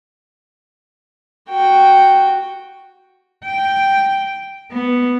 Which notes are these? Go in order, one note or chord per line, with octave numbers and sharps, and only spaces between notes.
F#4 G5
G5
B3